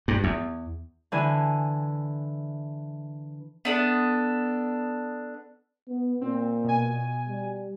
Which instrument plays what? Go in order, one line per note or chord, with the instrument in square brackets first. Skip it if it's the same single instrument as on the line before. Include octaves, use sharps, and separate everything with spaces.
[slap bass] G2
E2
[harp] D3 E3 G#5
[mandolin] B3 D4 A4
[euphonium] B3
[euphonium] A#2 [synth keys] C4
[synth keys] B2 G#5
[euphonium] G3